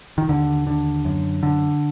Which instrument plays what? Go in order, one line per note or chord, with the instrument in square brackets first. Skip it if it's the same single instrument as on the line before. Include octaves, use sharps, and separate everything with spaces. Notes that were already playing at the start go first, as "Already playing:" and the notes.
[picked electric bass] D#3
D#2 D3
D3
F#2
D3